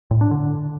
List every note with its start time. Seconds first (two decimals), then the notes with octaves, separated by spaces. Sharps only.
0.11 A2
0.21 D4
0.31 D3